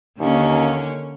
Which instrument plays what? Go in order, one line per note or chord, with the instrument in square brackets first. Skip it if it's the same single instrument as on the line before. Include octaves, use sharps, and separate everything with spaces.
[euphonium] D#2 [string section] D3 A#3 C#4